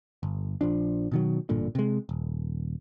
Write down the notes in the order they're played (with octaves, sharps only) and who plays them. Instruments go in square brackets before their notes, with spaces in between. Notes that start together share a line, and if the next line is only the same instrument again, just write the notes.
[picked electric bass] G1
A#1 F3 D4
B2 D#3 F#3
A1 G2 A#2 D3
C3 G#3
D#1